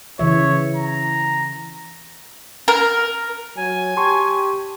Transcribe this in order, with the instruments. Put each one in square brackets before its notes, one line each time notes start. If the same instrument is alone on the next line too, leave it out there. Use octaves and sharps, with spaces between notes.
[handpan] C#3 E3 E5 [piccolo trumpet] C#5
[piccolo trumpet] A#5
[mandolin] A#4
[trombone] F#3 [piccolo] G#5
[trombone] G4 [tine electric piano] A5 C6 C#6